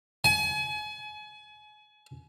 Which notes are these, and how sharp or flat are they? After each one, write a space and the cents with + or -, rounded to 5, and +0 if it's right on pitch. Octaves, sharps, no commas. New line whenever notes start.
G#5 +35